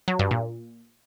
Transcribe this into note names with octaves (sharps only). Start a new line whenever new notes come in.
F#3
G2
A#2